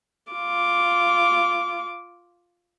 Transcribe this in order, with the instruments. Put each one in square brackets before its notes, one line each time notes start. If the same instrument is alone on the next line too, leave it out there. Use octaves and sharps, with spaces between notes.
[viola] F4 D6